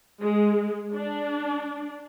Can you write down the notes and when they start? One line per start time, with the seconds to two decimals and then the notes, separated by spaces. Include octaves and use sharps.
0.23 G#3
0.95 D4